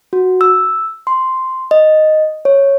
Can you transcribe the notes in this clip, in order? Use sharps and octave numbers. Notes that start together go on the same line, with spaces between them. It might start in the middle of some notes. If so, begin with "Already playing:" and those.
F#4
E6
C6
D#5
C#5